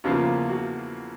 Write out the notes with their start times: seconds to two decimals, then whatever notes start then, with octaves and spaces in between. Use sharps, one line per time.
0.04 E2 C#3 F3 A#3 F4
0.49 F#4